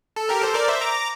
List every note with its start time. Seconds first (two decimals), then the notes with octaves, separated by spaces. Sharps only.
0.16 A4
0.29 G4 A#4
0.42 A4 C5
0.55 A#4 D5
0.68 C5 E5
0.81 A#5 D6